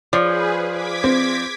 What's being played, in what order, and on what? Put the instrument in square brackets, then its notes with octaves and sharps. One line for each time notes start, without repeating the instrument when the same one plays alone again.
[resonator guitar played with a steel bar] F3 [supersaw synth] G#4 B4 [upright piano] C#5 [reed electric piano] D5
[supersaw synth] D6 G#6 B6
[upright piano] C4